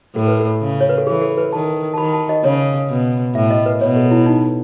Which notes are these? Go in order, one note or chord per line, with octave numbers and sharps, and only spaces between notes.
A2 A4
B4
A4
C#3
C#5
B4
A4
E3 G#4
A4
B4
D#3 A5
A5
D#3 B5
A5
D#5
C#3 C#5
B2
A2 E5
D#5
B4
B2 C#5
A4
E4
D#4